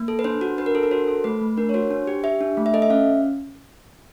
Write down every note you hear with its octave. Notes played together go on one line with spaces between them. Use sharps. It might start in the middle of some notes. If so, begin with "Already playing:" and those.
Already playing: A#3
A4
B4
D4 C5
F#4
D4 B4
A#4
D4 A4
A#4
F#4 C5
A4
A3 B4
A3
D4 A#4
C#5
F#4 C5
D4
G4
G4 E5
D4
A3
E5
A4 D#5
E5
C#4 F5